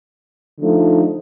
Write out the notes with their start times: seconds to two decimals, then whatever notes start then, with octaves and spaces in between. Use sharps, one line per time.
0.59 D3 F3 A3 D#4